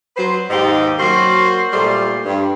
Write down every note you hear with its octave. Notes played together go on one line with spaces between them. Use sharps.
F#3 B4 C5
D#2 G#2 D#4 G4
F#3 A#3 F#4 C5
A#2 G3 A3 C5
G2